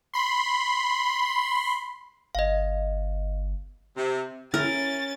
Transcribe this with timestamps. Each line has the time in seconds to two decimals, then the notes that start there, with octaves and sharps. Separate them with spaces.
0.14 B5 C6
2.35 G1 D#5 F5
3.97 C3
4.54 C#4 E4 A#4 A6